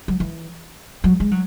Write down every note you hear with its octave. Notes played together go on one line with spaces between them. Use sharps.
F#3
E3
F#3
G#3
F#3